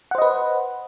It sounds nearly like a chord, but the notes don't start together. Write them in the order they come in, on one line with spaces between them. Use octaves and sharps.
F#5 C5 D#5 B4